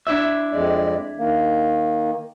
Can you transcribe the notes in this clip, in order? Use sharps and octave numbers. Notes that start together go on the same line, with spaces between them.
D4 E4 E5
F2 G#3 D5
D#3 A#3